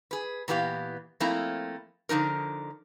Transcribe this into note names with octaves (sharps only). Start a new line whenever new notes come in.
G#4 B4
A#2 E3 B3 G4 F5
F3 A3 A#3 C4 E4
D3 F3 D#4 A#4